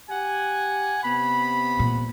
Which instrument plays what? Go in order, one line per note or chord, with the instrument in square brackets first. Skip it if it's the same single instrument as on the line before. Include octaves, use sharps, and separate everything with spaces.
[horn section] G4 F#5 G#5
C3 B3 B5
[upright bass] A#2